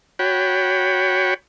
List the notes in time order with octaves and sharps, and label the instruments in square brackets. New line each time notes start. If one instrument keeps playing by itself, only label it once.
[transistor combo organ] F#4 C#5 G5 B5